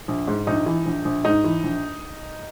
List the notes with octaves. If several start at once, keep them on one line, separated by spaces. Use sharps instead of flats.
A#1
G#2
A#1 D#4
E3
A#1
A#1
G#2 D#4
E3
A#1